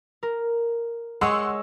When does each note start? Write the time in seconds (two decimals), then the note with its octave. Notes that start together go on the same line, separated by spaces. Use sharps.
0.23 A#4
1.21 G#3 C#5 F#5 C6 E6